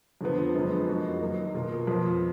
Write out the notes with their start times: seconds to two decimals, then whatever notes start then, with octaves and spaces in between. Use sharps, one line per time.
0.21 F2 D3 F3 B3
0.54 F#2 D3 F3 G#3 B3
0.88 F2 F3 A#3 D#4 F#4
1.21 F#2 D#3 A#3 D#4
1.54 B2 A#3 F4
1.87 F2 F3 B3 F4